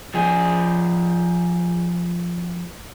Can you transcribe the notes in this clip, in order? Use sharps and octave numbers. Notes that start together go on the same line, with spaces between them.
F3 G#4